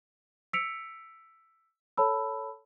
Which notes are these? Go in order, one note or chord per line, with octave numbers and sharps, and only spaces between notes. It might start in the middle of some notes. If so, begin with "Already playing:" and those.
E6 B6 C#7 D7 F7
A4 C#5 A5 B5 E6